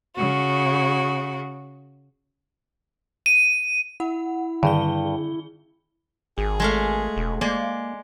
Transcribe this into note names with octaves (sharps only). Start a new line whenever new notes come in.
C#3 F#4
D#7
E4 F#5
G2 D3 D#3 G#4 G7
G#1 G#4
G#3 A3 F5
E1
G#3 A#3 D5